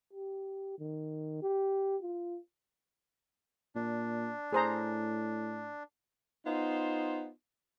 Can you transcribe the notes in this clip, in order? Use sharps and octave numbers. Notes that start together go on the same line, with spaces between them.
G4
D#3
G4
F4
A#2 D4
A2 G#4 C5 A#5
B3 D#4 F4 C5